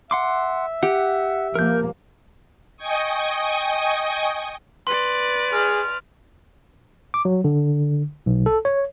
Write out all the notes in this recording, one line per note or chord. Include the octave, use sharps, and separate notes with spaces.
E5 F#5 C6 D6
G4 F#5
F3 A#3 A#4 G6
D#5 G5 G#5 C#6 D#6
B4 D5 C6
G#4 F6
D6
F#3
D3
B1
A4
C#5